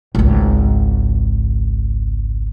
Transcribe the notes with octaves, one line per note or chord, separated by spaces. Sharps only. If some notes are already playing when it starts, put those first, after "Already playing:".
G#1 C#2